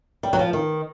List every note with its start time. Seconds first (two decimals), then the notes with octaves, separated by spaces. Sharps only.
0.23 G3
0.33 F#3
0.39 F3
0.53 D#3